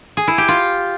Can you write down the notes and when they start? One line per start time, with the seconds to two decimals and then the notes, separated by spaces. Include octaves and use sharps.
0.17 G#4
0.27 E4
0.38 G4
0.48 F4